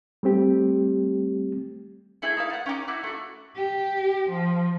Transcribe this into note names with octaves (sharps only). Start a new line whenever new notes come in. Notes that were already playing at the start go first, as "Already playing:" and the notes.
G3 A3 C4 G4
A3 E4 G#4 G6
D#4 E4 F5
F#5 A5
C#4 D#4 G5 D6
E4 F#4 D6
A3 F#4
G4
F3